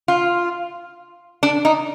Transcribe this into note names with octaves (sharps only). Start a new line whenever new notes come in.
F4
D4
D#4